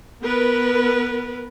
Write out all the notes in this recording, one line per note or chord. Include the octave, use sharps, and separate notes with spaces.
B3 A#4 B4